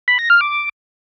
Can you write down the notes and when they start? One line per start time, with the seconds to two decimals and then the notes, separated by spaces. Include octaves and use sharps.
0.08 B5
0.19 A#6
0.30 F6
0.41 D6